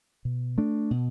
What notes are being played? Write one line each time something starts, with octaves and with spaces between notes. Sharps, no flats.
B2
A3 D4
B2